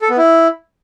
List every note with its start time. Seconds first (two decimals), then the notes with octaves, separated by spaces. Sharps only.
0.02 A4
0.10 B3
0.17 E4